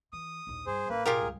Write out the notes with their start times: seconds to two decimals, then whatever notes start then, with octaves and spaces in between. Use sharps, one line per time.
0.13 E3 D#6
0.47 A#1 D#2
0.67 G2 G#4 C5
0.89 A1 A#3 C#4 B4
1.06 B1 A2 F4 G4 G#4 A#4
1.21 C#2 G2